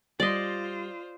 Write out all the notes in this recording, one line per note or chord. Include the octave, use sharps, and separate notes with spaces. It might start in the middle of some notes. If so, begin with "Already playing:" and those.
G3 F4 C5 D5 D#5